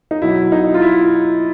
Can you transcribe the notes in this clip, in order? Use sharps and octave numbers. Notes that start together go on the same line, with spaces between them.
D#4
B2 F#3 E4
D#4
F4
E4